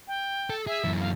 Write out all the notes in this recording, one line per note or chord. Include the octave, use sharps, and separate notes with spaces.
G5
A4
G#4 E5
F#2 E3
F5